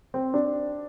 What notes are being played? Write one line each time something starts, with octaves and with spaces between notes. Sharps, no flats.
C4
D4